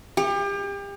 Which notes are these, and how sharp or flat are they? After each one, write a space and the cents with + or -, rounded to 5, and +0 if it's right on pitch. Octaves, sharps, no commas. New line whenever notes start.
G4 +35